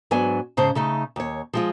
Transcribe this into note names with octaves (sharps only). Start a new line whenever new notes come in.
G#2 F#3 B3 D4 G#5
G#2 C#3 C5 A5
C#3 A3 D#4
D#2 C#5
F3 G#3 F4